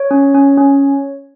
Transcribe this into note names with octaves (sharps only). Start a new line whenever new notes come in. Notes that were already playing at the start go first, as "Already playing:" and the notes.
Already playing: C#5
C#4
C#4
C#4